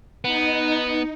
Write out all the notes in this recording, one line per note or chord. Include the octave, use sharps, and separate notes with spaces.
B3 D#4